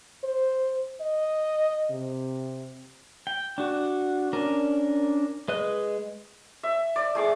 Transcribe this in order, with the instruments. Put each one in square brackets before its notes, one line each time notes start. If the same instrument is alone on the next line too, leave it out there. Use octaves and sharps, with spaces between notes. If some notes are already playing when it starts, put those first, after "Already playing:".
[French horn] C5
D#5
C3
[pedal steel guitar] G5
D4 F#4
C#4 D4 A#4
G#3 B4 D#5 F#6
[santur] E5
D5
A3 G#4 D6